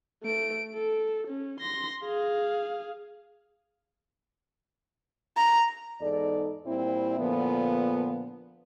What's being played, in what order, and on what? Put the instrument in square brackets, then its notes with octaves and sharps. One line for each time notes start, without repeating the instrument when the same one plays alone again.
[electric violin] A3 D7
A4
C#4
C6 A#6
G#4 F5
[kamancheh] A#5
[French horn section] E2 G#2 D#4 A4 D5
A#2 G3 C4 E4
A#2 D3 F3 B3